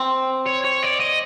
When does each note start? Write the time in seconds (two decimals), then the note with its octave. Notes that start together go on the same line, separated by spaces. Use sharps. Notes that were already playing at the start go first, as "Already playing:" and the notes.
Already playing: C4
0.46 C#5
0.65 C#5
0.83 D5
1.00 D#5